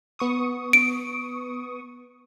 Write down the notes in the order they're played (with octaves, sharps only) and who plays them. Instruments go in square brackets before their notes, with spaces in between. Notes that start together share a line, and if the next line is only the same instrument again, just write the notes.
[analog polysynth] B3 C#6 D#6
[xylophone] D7